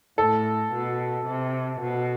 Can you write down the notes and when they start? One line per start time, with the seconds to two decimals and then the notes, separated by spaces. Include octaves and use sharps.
0.18 A2 A4
0.73 B2
1.26 C3
1.80 B2